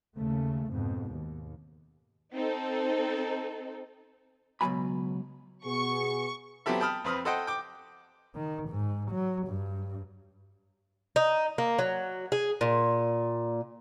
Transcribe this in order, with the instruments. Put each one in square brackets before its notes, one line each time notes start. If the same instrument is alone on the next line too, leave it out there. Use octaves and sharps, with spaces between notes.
[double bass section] D#2 C#3 A3
F2 G#2 B2
D#2
[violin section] C4 D#4 A4
[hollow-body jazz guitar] C#2 B2 D#3 F#3 G#5 B5
[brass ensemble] B2 B3 G#4 [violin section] C#6
[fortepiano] F#3 B3 C4 G4 A4 E5
G5 A5 B5 D#6 F6
F2 C4 B4 D#6 F6
A4 C5 D#5 F#5 G5
G5 D6
[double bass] D#3
G#2
F#3
G2
[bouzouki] D#4
A#3
F#3
G#4
A#2